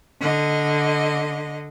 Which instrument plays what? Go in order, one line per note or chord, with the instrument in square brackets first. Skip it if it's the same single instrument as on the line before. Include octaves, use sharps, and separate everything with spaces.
[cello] D3 D#5